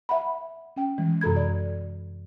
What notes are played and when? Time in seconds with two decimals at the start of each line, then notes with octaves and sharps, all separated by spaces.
0.09 E5 F#5 B5
0.77 C#4 G5
0.98 E3 G#3
1.21 F#2 C3 A4 B5 G#6
1.36 D5